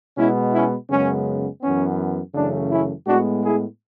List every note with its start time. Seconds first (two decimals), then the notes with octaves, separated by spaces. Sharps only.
0.17 B2 G#3 B3 C#4 E4
0.53 C#4 E4
0.90 F#2 C#3 G#3 B3 C#4
1.61 F#2 E3 B3 C#4
2.34 F#2 C#3 E3 A3 D4
2.70 C#4 E4
3.06 A2 G#3 B3 D4 F#4
3.43 E4 G#4